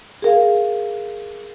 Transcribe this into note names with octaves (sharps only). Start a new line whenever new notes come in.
G#4 A#4 F5